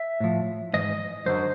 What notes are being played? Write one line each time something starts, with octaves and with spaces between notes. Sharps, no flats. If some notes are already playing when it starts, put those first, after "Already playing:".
Already playing: E5
A2 F3
G#2 E3 D#5
F#2 D3 F#3 C5